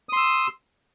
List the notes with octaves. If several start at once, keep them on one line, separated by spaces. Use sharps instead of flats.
C6 D#6 E6